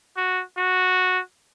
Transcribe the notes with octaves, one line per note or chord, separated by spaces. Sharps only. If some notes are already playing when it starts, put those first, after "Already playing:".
F#4
F#4